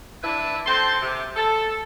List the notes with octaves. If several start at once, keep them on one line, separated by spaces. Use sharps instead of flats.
D4 E4 B4
C4 A4 G5 A5 C6
C3
A4